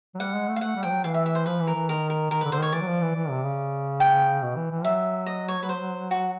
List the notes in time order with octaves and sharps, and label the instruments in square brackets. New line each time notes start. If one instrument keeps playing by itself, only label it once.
[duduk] F#3
[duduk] G3 [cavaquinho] F#5
[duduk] G#3
A3
[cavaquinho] F5
[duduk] A3 [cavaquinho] F#5
[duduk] G3
[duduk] F3 [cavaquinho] G5
[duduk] F#3
[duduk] E3 [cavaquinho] F5
[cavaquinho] E5
E5
C5
[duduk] F3 [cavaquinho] B4
[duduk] E3
[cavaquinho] A#4
[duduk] E3
[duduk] D#3 [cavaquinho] A#4
[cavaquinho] A#4
[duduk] D#3 [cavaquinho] A#4
[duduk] D3 [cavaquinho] B4
[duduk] D3 [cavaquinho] C5
[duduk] D#3 [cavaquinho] C#5
[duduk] E3 [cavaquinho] D5
[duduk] F#3
F3
E3
E3
C3
C#3
[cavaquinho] G5
[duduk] B2
E3
E3
[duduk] F#3 [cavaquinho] E5
[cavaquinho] D#5
C#5
B4
C5
F#4